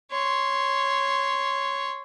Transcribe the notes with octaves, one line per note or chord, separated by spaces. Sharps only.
C#5 C6